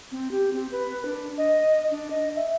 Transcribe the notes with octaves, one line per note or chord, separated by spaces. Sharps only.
C4
G4
C4
B4
D4
D#5
D4
D#5
E5